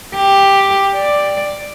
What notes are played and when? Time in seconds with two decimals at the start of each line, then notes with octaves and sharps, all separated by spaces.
0.15 G4
0.96 D5